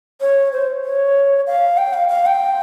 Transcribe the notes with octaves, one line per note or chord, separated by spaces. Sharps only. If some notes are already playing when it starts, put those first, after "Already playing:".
C#5
C5
C#5
F5
G5
F5
F5
G5